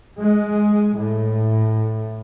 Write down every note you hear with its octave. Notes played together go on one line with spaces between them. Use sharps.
G#3
A2